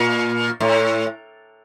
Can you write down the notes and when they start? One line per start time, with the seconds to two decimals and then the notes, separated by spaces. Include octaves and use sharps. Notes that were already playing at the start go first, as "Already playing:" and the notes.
Already playing: A#2
0.60 A2